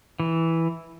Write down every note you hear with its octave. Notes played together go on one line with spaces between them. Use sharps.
E3